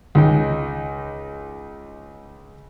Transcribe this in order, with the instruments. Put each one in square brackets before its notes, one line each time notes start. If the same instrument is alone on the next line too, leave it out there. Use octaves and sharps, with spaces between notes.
[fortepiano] C#2 D#4 G5